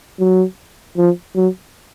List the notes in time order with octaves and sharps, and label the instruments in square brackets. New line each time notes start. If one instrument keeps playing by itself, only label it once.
[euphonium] F#3
F3
F#3